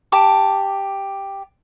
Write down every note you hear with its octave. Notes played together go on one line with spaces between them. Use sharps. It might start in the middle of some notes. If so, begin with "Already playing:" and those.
G4 A5 D6